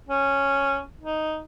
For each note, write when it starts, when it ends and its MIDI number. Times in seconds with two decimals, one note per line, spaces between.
0.09 0.80 61
1.01 1.41 63